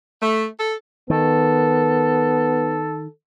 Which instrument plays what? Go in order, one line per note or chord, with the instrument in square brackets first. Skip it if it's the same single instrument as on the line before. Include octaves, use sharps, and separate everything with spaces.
[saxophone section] A3
A4
[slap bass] D#3 [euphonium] B3 [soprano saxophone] A4